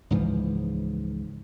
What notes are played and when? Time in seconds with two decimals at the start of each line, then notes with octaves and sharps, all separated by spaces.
0.10 C#2 G#2 E3 F3